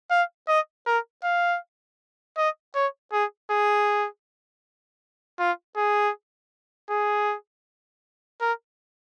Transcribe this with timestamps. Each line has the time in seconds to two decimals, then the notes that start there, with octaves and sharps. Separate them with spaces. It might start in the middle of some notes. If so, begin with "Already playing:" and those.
0.11 F5
0.48 D#5
0.87 A#4
1.24 F5
2.38 D#5
2.75 C#5
3.13 G#4
3.51 G#4
5.40 F4
5.77 G#4
6.90 G#4
8.41 A#4